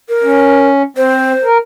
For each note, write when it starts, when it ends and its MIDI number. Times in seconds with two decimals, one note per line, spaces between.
0.09 0.68 70
0.24 0.82 61
0.97 1.33 60
0.97 1.45 72
1.44 1.58 70